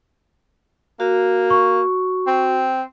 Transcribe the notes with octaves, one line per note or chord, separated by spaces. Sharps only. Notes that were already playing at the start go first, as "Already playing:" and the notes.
A#3 F#4
C#6
C4